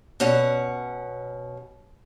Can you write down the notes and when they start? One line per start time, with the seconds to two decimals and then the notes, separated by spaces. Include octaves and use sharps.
0.20 B2 C#4 F#5